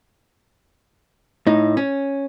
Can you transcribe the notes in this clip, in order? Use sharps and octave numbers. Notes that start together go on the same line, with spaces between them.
A2 D#4
C#4